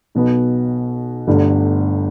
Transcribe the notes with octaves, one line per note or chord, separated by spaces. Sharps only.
B1 B2 B3
G1 G2 D3 A3